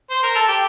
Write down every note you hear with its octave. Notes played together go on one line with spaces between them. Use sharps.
C5
A#4
A4
G4